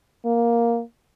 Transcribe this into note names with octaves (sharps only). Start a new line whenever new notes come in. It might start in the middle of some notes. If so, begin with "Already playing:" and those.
A#3